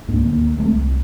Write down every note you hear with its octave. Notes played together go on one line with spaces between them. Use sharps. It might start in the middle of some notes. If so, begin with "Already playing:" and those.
C#2 G#2 A#3 D4
D2 A#3
B1 G#3 A3 C4
C2